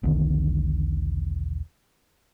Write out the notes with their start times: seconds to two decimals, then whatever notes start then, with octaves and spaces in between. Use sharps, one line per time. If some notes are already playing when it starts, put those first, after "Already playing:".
0.03 E1 B1 D3 D#3